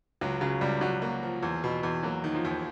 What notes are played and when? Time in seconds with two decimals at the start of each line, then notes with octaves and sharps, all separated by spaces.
0.21 C#2 F#3
0.41 C#3 F#3
0.61 C#2 G3
0.81 F#3 F#4
1.02 A#3
1.23 F3
1.43 E2
1.64 B2
1.83 E2
2.03 F#3 A#3
2.24 D#3
2.34 F3
2.45 D#2